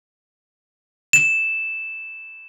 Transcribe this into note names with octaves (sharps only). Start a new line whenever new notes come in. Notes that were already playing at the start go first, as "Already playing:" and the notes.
E7